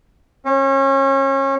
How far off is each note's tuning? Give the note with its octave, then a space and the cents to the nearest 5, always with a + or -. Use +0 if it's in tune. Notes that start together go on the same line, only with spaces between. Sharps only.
C#4 -30